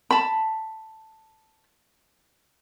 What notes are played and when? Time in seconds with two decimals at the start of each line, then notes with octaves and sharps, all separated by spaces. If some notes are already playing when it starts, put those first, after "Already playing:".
0.11 A5 B5